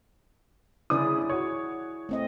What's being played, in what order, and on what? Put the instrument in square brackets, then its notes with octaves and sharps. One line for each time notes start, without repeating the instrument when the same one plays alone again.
[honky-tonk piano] G1 C#3 D#6 [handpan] E4 G#4 D5
[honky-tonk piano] F#4 C#5
[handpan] A3 C4 D#5